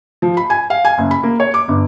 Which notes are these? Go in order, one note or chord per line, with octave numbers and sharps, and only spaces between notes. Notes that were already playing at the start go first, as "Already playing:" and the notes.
F3
B5
G#5
F5
G#5
F#1
B5
A#3
C#5
D6
G1